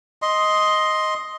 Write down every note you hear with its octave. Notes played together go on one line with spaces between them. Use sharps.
D#5 C6